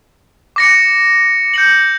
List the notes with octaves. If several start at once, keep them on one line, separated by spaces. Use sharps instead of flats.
D6 A#6 C#7
G6 C#7 F#7